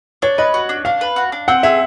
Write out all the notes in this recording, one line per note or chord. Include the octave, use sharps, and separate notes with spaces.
D4 C#5
B4 D#5
F#4
D4
D4 F5
B4
F#4
D4
C4 F#5
G#4 E5